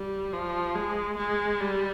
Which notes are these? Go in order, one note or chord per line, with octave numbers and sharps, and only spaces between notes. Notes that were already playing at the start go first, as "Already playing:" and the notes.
Already playing: G3
F3
G#3
G#3
G3